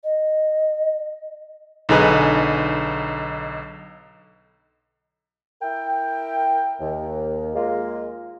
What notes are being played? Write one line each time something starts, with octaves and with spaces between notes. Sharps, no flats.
D#5
B1 D3 D#4 G#4 B4
E4 A#4 E5 G5
D#2
G#3 A#3 F4